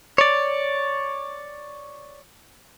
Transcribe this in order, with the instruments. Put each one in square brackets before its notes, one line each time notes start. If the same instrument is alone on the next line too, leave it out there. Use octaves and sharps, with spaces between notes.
[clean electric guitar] C#5 D5